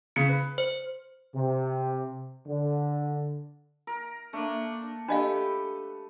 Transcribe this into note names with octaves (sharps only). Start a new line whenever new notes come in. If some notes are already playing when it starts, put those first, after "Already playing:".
C#3 C#7
B4
C5
C3
D3
A#4
A3 A#3 D4
D4 G4 A4 B4 D#5 F5